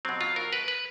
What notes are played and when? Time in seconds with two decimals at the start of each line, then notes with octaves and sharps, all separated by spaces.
0.05 B2 F#3 C4
0.21 F4
0.36 A#4
0.53 B4
0.68 B4